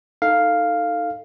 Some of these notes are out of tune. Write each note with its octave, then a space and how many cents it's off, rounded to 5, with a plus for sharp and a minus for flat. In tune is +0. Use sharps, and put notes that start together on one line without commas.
D#4 +0 A4 +15 F5 +0